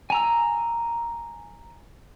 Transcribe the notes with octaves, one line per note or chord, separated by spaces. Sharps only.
G#5 A#5 E6